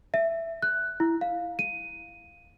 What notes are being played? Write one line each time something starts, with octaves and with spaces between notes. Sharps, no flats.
E5
F#6
E4
F5
D#7